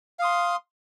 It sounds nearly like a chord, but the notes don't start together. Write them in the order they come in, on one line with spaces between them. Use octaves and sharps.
F5 D#6 C6